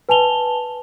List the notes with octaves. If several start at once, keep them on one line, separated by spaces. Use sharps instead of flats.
B4 G#5 A5 F7 G7